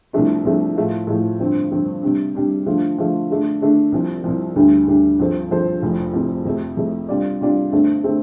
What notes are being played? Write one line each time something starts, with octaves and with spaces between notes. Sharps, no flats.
C2 C3 F3 A3 D4
C2 C3 F3 A3 D4
A2 F3 A3 F4
A2 F3 A3 F4
G2 D3 F3 C4
G2 D3 F3 C4
C3 G3 D4
C3 G3 D4
D3 F3 A3 F4
D3 F3 A3 F4
D3 A3 D4
D3 A3 D4
C2 C3 F3
C2 C3 F3
D2 D3 G3 D4
D2 D3 G3 D4
G2 F3 C4 A4 C5
G2 F3 C4 A4 C5
F1 F2 C3 F3
F1 F2 C3 F3
F2 C3 A3
F2 C3 A3
C3 G3 D4 F4 D5
C3 G3 D4 F4 D5
G2 D3 A3 C4
D3 A3 C4